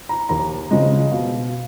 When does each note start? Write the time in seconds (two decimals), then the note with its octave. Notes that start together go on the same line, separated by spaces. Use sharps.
0.09 A#5
0.29 D#2 A#5
0.71 C#3 F3 G#3 D#5
1.11 B2 F5